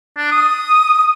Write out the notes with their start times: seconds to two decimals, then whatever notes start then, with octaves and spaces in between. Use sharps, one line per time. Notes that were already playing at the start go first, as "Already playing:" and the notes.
0.17 D4
0.32 D#6